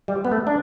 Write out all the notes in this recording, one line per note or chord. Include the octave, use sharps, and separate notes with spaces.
G3
B3
A3
D4